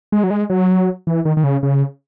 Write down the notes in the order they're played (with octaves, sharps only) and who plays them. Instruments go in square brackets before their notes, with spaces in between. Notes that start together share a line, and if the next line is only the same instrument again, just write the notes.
[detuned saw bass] G#3
F#3
G#3
F#3
E3
D#3
D#3
C#3
C#3